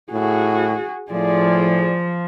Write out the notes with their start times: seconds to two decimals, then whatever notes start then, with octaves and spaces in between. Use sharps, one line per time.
0.12 A2 F#4 G#4
1.11 A2 F3 G#4 D5